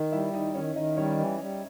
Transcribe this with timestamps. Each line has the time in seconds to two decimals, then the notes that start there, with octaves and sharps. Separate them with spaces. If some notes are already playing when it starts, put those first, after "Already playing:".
Already playing: D#3
0.12 G3 E4 E5
0.33 D#3 D#4 D#5
0.55 D#3 C#4 C#5
0.76 D#3 D#4 D#5
0.97 G3 C#4 C#5
1.18 E3
1.40 G3